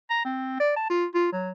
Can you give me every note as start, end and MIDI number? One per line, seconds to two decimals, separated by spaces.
0.10 0.23 82
0.25 0.60 60
0.60 0.72 74
0.76 0.89 81
0.90 1.05 65
1.14 1.29 65
1.33 1.51 54